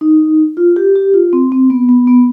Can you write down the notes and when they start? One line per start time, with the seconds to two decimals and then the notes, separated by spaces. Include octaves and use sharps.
0.01 D#4
0.57 F4
0.76 G4
0.95 G4
1.14 F4
1.33 C4
1.52 C4
1.70 B3
1.89 B3
2.07 B3